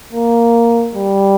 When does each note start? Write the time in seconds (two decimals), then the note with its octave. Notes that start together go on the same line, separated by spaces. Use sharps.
0.13 A#3
0.95 G3